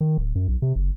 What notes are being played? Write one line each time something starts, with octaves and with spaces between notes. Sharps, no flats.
D#3
D1
F#2
B1
C3
F#1